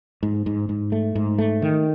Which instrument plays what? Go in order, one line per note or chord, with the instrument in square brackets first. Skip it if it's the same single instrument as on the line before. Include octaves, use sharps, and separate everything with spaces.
[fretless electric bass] G#2
G#2
G#2
A3
G#2
A3
D#3